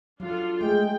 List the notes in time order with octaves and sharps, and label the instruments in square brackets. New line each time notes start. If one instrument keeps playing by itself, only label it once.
[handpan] F#3 [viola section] D4 F4 A4
[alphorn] G#3 [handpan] A3 G#4 [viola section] G5